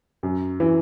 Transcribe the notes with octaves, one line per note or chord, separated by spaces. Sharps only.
F#2
E3